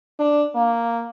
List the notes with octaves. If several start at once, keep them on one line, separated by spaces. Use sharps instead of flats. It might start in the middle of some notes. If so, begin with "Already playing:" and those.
D4
A#3